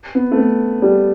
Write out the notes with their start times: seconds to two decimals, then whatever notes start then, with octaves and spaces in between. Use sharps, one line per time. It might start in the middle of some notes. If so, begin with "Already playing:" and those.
0.15 B3
0.31 A3
0.37 B3
0.82 G3